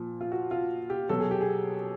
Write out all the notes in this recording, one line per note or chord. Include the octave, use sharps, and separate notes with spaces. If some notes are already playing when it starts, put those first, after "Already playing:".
Already playing: A#2 F3
F4
F#4
F4
G4
B2 F#3 A4
G#4
G4
G#4